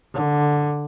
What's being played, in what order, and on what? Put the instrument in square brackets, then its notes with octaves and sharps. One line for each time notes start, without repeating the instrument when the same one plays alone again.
[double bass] D3